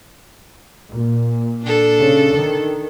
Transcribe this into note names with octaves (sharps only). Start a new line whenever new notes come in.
A#2
D4 A4
C#3
D#3